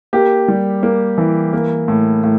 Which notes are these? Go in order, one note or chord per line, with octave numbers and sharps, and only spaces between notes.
A#3 G4
G3
A#3
E3
A#3
A2
A2